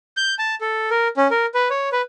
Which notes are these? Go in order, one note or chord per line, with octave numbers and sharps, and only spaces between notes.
G6
A5
A4
A#4
C#4
A#4
B4
C#5
B4